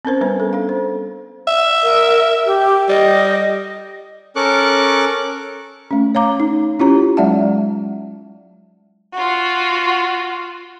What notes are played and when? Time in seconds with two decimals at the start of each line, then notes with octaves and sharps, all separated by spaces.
0.05 C4 C#4 A#4 C5
0.21 G3 B3 D4 B4
0.40 A4
0.53 D4 F5
0.69 C5
1.48 E5
1.83 A#4
2.46 G4
2.89 G3 D#5
4.36 C#4 A4 A#4 C#6 D6 F#6
5.91 A3 C#4
6.15 C#5 F5 A#5 D6
6.40 D#4
6.80 C#4 E4 F4 G4 C#5 A#5
7.17 F#3 G#3 D5 E5 F#5 A5
9.12 F4 F#4